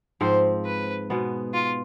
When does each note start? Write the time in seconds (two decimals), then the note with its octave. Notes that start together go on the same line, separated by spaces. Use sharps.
0.21 G#2 F3 C4 C5
0.65 B4
1.10 B2 G#3 B3
1.54 F4